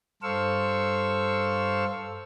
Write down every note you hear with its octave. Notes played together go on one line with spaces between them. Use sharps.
G2 A4 C5 F5 C#6 E6